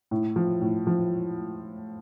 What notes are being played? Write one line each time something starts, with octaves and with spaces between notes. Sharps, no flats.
A2
F3
A2
F3